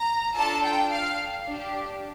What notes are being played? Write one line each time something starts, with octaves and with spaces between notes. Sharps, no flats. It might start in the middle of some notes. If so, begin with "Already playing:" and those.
Already playing: A#5
D4 F4 A4 A5
G5
F5
D4 G4